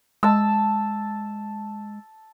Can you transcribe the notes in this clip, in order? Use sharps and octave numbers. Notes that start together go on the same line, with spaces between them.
G#3 A5 E6